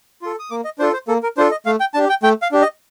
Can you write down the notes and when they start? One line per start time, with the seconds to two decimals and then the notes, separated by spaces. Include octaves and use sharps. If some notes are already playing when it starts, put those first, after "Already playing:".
0.22 F4 A4
0.39 D#6
0.50 A#3 D6
0.65 D#5
0.79 D4 F4 A4 C5
0.93 C5
1.08 A#3 A4
1.23 A#4
1.37 D4 F4 A4 C5
1.51 D#5
1.66 A3 F5
1.80 G5
1.94 D4 G4 A5
2.09 G5
2.23 A3 G5
2.42 F5
2.52 D4 G4
2.62 D#5